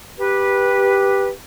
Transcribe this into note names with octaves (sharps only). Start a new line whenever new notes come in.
G4 B4